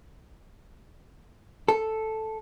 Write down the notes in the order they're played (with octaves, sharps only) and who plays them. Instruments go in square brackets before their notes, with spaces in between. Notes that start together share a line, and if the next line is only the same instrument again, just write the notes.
[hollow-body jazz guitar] A4